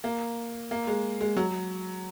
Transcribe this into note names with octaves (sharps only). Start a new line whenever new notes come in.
A#3
A#3
G#3
G#3
F#3